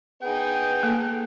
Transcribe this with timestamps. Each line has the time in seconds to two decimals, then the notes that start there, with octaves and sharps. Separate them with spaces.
0.22 B3 D#4 G#4 G5
0.83 A#3 A4